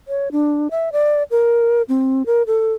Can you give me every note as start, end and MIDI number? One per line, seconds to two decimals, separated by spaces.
0.08 0.32 73
0.32 0.68 62
0.71 0.92 76
0.92 1.23 74
1.31 1.82 70
1.89 2.26 60
2.26 2.43 70
2.47 2.73 69